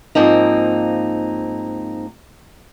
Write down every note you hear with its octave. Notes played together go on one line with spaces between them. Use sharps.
G#2 F3 A#3 C4 D#4